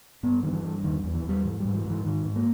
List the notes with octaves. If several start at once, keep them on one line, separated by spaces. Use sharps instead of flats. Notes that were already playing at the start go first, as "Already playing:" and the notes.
G2 B3
G2 D#3
E3
G2
E2 D#3
E2
E3
E2 G3
G#2 E3
G#2 G3
E3
G#2 E3
G#2 D#3
G#2
A#3